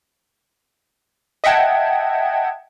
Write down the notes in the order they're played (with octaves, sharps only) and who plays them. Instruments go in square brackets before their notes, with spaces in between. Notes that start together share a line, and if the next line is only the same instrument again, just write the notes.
[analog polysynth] D#5 E5 F#5 G5 A5 G#6